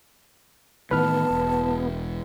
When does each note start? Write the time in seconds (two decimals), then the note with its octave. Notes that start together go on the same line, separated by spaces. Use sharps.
0.91 A2 D#3 E3 B3 B4 A5 F6
1.31 E1